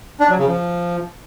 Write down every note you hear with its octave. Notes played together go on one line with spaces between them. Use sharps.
D4
F#3
C#3
F3